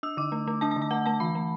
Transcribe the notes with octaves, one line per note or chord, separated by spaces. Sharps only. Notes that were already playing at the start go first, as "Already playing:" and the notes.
D4 E6
D3 D6
A3
A3
D4 A5
A5
D3
A5
A3 F#5
A3 A5
E3 B5
A3